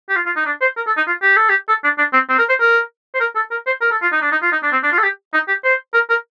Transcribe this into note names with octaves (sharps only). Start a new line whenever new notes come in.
G4
F4
F4
D#4
D4
C5
A#4
A4
D#4
F4
G4
A4
G4
A4
D4
D4
C4
C4
A#4
C5
A#4
C5
A#4
A4
A#4
C5
A#4
A4
F4
D#4
D4
D#4
F4
D#4
D4
C4
D4
F4
A4
G4
D#4
G4
C5
A#4
A#4